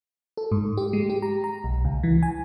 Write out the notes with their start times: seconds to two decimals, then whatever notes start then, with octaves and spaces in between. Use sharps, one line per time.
0.37 A4
0.52 G#2
0.77 G4
0.93 G#3
1.10 G4
1.22 A#5
1.44 A#5
1.64 B1
1.85 C#2
2.03 E3
2.23 G#5